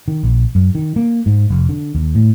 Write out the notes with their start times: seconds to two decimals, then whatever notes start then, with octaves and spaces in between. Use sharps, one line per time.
0.08 D#3
0.23 A#1
0.55 F#2
0.75 D#3
0.96 A#3
1.26 G#2
1.50 F1
1.69 D3
1.95 D#2
2.15 A2